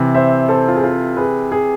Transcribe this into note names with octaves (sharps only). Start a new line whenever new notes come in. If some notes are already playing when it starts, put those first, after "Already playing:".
Already playing: C3 E3
C5 E5
A4 C5
F4
G#4
F4 A4
G#4 B4
G#4